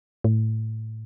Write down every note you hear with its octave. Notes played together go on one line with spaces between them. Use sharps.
A2